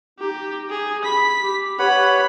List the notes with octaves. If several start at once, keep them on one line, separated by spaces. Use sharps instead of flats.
D#4 G4
G#4
B5 B6
G4
G4 B4 C#5 F#5 B5